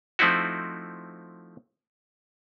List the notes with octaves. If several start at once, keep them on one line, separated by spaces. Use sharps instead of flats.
F3 A3 C4 D#4 E4 F#4